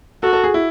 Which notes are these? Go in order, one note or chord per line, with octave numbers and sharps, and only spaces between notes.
F#4 A4
A4
G#4
E4